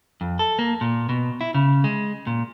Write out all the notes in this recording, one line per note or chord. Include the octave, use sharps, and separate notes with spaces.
F2
A4
A#3
A#2
B2
E4
C#3
G#3
A#2